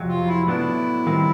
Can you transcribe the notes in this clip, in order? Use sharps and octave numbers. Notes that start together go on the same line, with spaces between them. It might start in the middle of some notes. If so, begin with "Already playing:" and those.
Already playing: F2 C3 F#3
F4
E4
A2 F#3 B3 D4 E4
D#3 G3 C4 F4 A#4